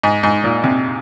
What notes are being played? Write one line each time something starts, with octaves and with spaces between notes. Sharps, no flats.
G#2
G#2
A#2
C3